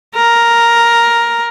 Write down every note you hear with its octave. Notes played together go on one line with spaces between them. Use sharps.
A#4